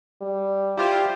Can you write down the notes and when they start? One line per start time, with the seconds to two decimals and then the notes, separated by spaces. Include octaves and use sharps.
0.21 G3
0.77 E4 F4 G4 C5